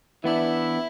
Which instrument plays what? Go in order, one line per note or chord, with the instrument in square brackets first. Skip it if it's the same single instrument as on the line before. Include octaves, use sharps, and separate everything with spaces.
[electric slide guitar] E3 B3 D4 [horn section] E4